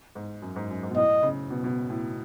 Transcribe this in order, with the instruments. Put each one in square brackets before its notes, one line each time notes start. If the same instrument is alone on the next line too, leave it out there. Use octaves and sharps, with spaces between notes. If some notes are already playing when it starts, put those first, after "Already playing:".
[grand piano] G#2
F#2
G#2
F#2
G#2
B2
[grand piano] A2 [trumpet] D#5
[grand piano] C#3
B2
B2
A2